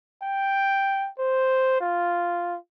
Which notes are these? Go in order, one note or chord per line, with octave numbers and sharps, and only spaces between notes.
G5
C5
F4